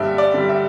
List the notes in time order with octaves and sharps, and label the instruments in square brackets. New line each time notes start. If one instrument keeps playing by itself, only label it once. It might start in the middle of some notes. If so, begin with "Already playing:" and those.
Already playing: [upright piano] G2 D3 G3 E5
D5
D3 G3
E5